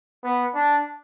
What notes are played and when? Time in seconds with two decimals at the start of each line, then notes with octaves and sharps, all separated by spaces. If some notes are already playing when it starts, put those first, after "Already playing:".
0.24 B3
0.55 D4